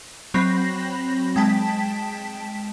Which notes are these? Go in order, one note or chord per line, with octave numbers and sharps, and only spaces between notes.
F#3 C4 B5 A#6
G#3 G5 A5 B6